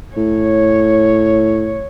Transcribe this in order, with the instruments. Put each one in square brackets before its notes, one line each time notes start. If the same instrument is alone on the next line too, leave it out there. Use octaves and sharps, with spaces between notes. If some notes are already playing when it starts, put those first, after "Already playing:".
[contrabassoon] A2 [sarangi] C#5